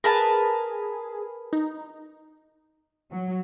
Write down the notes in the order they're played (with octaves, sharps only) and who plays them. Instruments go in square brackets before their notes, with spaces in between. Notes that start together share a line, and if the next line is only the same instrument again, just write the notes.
[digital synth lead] G#4 [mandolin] A#4 B4 A5
[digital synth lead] D#4
[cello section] F#3